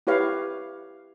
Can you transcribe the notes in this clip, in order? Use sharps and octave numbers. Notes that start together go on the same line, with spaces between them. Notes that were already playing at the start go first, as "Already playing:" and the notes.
E4 G4 B4 C#5 F5